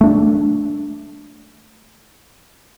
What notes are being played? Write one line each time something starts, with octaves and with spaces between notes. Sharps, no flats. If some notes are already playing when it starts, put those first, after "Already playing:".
A3 D4